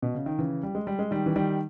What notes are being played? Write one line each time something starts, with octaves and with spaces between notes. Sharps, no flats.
B2
C#3
D#3
C#3 E3
G3
G#3
G3
G#3
D#3 G3
E3
D#3 G3